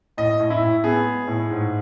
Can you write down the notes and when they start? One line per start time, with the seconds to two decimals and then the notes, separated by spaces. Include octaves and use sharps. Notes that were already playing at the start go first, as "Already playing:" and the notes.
0.17 A2 D#5
0.40 A2
0.50 E4
0.61 A2
0.84 B3 G#4
1.06 G#3
1.27 A2
1.50 G#2